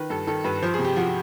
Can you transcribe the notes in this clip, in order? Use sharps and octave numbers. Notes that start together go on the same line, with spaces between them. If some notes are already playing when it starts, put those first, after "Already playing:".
Already playing: D#3 B4
G2 A4
D#3 A4
G2 B4
F3 C5
G#4
C3
G4
F3 F#4